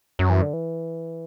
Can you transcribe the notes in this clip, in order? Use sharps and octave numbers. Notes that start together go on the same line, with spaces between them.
F#2 F#3
E3
D3
E3